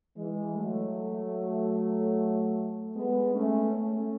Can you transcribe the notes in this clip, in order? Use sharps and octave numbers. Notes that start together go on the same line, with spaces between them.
E3 G#3
F#3 A3
G#3 B3
A3 C#4
A3 C#4